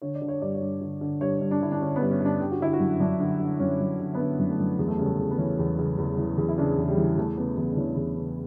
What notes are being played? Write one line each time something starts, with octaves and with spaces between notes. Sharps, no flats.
D3 C#5
D5
D3
C#5
G2 D5
C#5
G2
D3
D3
G2 C#5
G2
D4
D3 E4
D4
D3 C#4
B3
G2
C#4
G2 D4
D3 G4
F#4
D3 E4
F#4
F#2
F#2 D4
D3
D3
F#2 C#4
F#2
D3
B3
D3 C#4
F#2
A3
F#2
E2 B3
A3
C#3 G3
A3
E2
B3
E3 C#4
E2
C#3
E2
E3
E2
E4
C#3 D4
E2
G3
E3
E2 A3
C#3 B3
E2 B3
D4
E3 C#4
E2
C#3